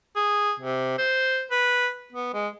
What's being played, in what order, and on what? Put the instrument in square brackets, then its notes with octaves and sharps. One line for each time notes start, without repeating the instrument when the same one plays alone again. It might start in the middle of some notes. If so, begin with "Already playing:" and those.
[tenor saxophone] G#4
C3
C5
B4
B3
G#3